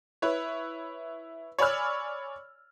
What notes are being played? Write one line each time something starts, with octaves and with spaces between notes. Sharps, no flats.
E4 B4 C#5
C#5 D5 G#5 B5 E6 F6